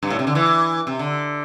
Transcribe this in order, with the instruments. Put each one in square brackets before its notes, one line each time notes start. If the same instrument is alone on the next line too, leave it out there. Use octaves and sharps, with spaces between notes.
[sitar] G2
A2
C3
D3
E3
C3
D3